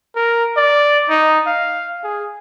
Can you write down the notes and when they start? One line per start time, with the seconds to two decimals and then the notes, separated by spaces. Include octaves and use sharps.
0.16 A#4
0.57 D5
1.09 D#4
1.47 F5
2.03 G#4